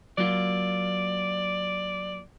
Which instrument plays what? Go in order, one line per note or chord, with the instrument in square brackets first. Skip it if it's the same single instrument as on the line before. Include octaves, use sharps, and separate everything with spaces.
[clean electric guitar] F#3 A#3 F4 [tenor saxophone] D5